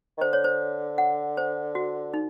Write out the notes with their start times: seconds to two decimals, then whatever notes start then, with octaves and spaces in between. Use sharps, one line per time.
0.18 D#3
0.21 D3 C5
0.33 C#5
0.44 C5
0.98 F#5
1.37 C5
1.75 F#4
2.14 D#4